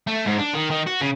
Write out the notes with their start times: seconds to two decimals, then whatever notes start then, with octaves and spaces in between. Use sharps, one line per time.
0.07 A3
0.25 G#2
0.38 D4
0.54 D#3
0.70 D#3
0.86 F#4
1.01 C#3